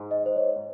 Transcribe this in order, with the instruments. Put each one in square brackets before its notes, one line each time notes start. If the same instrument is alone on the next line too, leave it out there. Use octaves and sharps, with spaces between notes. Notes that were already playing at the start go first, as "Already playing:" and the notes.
Already playing: [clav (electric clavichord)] G#2
[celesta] D#5
C5
C#5